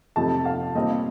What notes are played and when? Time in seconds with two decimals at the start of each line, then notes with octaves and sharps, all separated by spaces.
0.16 F2 C3 F3 A3 D#4 A5
0.45 F5
0.75 A#2 G3 C4 D#4 D#5